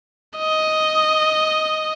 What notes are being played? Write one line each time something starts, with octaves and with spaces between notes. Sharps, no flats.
D#5